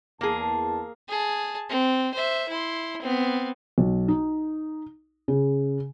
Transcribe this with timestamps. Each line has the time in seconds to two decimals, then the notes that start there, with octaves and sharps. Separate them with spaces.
0.21 E2 A#3 G#4 A5
1.09 G#4 A5
1.69 C4
2.14 C5 E5
2.49 E4 C6
3.02 B3 C4
3.78 B1
4.08 D#4
5.28 C#3